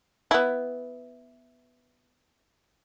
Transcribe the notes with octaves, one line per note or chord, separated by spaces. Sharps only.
B3 E4